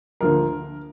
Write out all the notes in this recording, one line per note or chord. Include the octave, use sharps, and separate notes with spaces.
D2 D3 F3 A#3 A#4